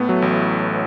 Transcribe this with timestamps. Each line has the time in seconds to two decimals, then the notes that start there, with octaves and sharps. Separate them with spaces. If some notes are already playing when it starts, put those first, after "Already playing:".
Already playing: A2 A3 B3
0.09 F#3
0.22 A1